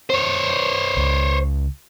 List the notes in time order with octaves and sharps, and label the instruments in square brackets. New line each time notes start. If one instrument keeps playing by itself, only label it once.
[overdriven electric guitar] C5 C#5
[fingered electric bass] C#2